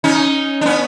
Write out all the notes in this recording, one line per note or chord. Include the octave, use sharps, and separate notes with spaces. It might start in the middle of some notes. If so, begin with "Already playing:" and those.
C#4 D#4
D4
B3 C#4